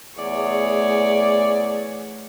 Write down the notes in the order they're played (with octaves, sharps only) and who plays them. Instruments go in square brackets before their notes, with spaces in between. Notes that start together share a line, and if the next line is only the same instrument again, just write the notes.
[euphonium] E2 [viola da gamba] A3 G#4 C#5 [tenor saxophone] D5